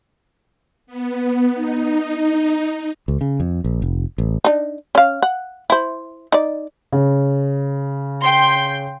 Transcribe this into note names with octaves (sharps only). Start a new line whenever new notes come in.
B3
D#4
C#2
C#3
F2
A#1
F1
A1
D4 D#4
C#4 F5
F#5
E4 C5
D#4 D5
C#3
G5 C6